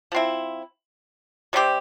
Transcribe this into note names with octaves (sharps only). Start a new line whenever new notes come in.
F3 C4 E4
C3 G3 C4 G4